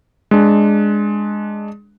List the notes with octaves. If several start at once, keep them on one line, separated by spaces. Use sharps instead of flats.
G#3 D4